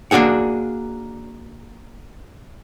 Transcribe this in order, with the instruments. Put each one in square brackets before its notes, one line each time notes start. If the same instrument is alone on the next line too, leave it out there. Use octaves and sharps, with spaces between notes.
[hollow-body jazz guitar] A#3 D4 F#4 G#4 F#5